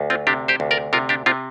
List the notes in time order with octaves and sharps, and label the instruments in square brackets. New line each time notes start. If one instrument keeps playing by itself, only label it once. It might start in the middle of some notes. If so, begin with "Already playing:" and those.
Already playing: [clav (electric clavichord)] D2
C4 F4
C3 D4 G4
G4 C5
D2
A#4 D5
C3 F4 A#4
D4 G4
C3 C4 F4